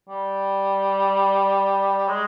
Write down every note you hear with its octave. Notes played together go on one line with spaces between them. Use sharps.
G3
G#3